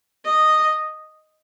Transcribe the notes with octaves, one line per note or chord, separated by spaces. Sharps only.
D#5